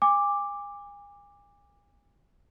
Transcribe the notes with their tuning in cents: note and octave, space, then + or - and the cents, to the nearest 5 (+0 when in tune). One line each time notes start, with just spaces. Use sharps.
G#5 -35 D6 +0